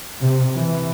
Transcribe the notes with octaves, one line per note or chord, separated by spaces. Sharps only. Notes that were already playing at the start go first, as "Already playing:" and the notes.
C3
E3